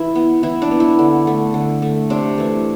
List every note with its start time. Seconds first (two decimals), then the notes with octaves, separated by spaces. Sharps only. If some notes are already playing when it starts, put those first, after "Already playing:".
Already playing: E3 E4
0.15 B3
0.43 E3 E4
0.62 D4
0.71 B3
0.80 E4
0.99 D3
1.27 A3
1.54 D3
1.82 A3
2.10 C3 D4
2.38 E3 A3